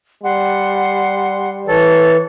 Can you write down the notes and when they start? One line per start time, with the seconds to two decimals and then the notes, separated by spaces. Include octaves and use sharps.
0.23 G3 F#5 C6
1.66 E3 A4 C#5